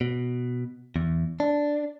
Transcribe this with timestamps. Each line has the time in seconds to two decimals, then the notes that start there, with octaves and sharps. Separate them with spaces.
0.01 B2
0.96 E2
1.40 D4